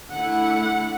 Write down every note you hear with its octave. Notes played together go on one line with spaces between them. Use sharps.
D3 A3 E4 F#5